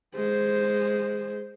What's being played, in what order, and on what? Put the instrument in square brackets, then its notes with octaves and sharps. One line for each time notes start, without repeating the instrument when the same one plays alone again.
[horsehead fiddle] G#3 C5